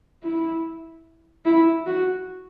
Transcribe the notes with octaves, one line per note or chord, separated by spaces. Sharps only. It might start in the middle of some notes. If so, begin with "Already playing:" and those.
E4
E4
F#4